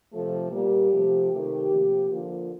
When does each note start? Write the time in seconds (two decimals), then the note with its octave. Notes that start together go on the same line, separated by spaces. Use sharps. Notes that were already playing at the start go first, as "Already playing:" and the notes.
0.11 C3 F3 A3 A4
0.51 A#2 G3 A#3 G4
0.91 C3 F3 A3
1.31 C3 D#3 A3 G4
1.70 C3 F3 A#3
2.10 D3 F3 A#3 F4